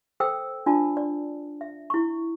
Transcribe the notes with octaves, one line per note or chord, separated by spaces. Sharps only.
A4 C5 G5 E6
D4 F4 D5 A5
D5
E5
E4 C#6